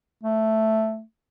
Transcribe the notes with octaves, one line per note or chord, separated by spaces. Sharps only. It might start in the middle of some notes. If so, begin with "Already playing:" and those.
A3